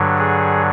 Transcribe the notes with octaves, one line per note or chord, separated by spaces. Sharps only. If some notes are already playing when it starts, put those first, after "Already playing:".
Already playing: G2 D3 F#3
G#4